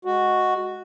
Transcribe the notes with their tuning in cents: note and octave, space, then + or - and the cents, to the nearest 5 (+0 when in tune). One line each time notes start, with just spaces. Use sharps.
G#3 +0 F#4 +0